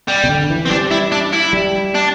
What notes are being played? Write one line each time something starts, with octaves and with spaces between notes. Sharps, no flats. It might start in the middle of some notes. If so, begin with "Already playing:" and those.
G3
C3
D3
E3
C4
G3 D4
E4
D4
E4
G3
D4